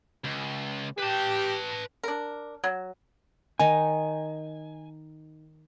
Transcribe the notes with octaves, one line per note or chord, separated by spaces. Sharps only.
C#2
G4 B4 A5
D4 A#4
F#3
D#3 D#4 G#5